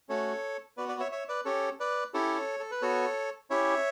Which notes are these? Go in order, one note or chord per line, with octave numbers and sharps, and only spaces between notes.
A3 C#4 F#4 A4 C#5
B3 F#4 B4 D5
B4 D5
C#5 E5
C#5 E5
B4 D5
C#4 G4 A4 C#5
B4 D5
C#4 E4 G4 A4 C#5
A4
B4
B3 F#4 A4 C#5
C#4 E4 G4 C#5 E5